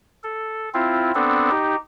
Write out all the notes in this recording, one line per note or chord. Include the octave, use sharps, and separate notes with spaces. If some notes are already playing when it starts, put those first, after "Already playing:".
A4
C4 E4 F4
B3 C4 D4 A4
D#4 G4